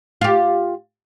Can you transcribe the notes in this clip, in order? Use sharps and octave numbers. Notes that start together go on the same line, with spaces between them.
F4 G4